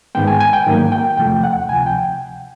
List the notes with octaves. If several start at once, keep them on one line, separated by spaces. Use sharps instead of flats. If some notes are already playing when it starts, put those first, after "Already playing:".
G#2 D#3 G#3 B3 G5
G#5
G#5
G5
G#2 D#3 F#3 A#3
G5
E2 C3 F3 A3 G5
F#5
D2 C3 F3 G#5
G5